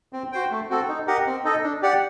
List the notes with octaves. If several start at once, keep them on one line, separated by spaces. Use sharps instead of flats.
C4
F#4 C5 G5
A3
C4 F#4 A4
D#4
G4 A#4 D#5 F#5
C4
D#4 A4 D#5
D4
G4 D5 F#5